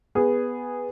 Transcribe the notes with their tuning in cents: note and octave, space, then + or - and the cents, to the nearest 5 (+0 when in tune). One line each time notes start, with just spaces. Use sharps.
B3 +0 G#4 -10